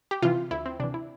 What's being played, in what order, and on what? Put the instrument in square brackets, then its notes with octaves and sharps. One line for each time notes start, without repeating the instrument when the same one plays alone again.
[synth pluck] G4
C3 E3 F4
D2 E4
C4
C3 E3 D4
E4